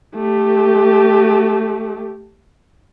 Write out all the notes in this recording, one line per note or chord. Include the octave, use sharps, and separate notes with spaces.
A3 G4